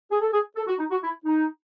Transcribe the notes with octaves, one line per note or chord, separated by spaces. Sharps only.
G#4
A4
G#4
A4
F#4
D#4
F#4
E4
D#4